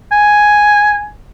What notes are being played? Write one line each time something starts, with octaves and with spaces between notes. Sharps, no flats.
G#5